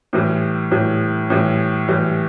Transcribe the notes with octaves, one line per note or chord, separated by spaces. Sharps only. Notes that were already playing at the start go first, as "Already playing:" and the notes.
A2 E3 G3
A2 E3 G3
A2 E3 G3
A2 E3 G3